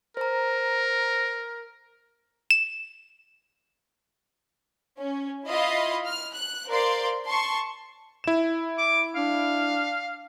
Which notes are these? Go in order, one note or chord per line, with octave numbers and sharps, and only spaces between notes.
A#4 C5 A#5
E7
C#4
E4 F4 D#5 F5 B5 C6
F6
F#6
A#4 C5 D5 F5 C6
A5 C6 C#6
E4 E7
D6
D4 F5